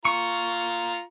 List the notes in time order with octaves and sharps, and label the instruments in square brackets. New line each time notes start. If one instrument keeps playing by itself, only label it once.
[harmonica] F4 A#5 [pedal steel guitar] C#6